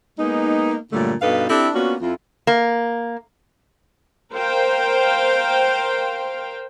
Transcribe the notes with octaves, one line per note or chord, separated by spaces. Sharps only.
G#3 A#3 B3 D#4
G2 A#2 D3 F#3 G3 A3
G2 B2 D#4 A4 B4 F5
C4 D4 E4 G4 A4
A#3 B3 C#4 D4 F4 F#4
F2 E4 F4
A#3
A#4 C5 F5 G5